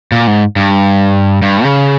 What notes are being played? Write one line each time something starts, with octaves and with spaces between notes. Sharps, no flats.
A#2
G#2
G2
G2
C#3